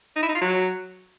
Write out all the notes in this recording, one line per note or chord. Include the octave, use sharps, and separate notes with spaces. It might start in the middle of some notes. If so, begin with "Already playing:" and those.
D#4
E4
D#4
F4
F#3